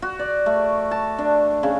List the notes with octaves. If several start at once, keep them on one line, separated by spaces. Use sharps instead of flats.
F#4
D5
A3
A5
D4
C#3